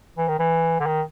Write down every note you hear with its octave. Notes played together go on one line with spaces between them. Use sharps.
E3
D#3
E3
D3
D#3